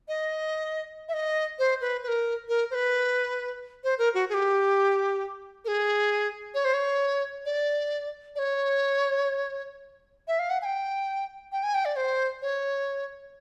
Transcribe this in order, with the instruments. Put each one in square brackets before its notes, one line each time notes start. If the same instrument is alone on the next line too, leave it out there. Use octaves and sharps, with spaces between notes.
[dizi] D#5
E5
D#5
C5
B4
B4
A#4
A#4
C5
B4
C5
A#4
F#4
G#4
G4
A#4
G#4
C#5
C5
C#5
D5
D5
C#5
E5
F5
F#5
G#5
G5
G5
G#5
G5
D5
C5
C#5